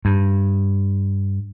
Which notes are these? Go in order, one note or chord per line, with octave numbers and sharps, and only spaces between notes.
G2